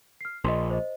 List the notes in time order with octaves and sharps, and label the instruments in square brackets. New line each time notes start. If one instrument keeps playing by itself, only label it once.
[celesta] F6 C7
[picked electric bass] A#1 [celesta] D#5 C6
[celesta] C5 D#5